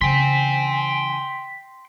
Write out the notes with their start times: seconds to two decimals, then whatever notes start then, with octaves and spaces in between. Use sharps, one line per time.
0.01 C#3 E3 G5 G#5 C6 B6